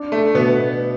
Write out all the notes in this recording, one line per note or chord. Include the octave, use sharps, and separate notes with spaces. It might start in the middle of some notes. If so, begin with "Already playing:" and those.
Already playing: D4
A3
B2 B3